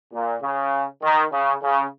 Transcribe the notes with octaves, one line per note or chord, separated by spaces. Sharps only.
A#2
C#3
D#3
C#3
C#3